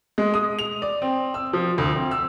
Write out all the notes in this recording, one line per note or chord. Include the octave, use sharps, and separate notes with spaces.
G#3
D#6
F7
D5
C4
E6
F3
D2
C4
E6